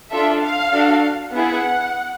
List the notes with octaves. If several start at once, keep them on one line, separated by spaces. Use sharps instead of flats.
D4 F4 A4 E5
F5
D4 F#4 A4
B3 E4 G#4 F#5